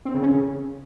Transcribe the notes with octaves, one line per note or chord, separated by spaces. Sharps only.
C4
C#3
C#4
C#3